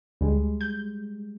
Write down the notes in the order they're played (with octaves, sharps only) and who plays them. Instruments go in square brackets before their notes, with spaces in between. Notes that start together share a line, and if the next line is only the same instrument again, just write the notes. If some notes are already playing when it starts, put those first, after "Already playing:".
[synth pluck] D2 [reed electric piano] G3 G#3
[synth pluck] G6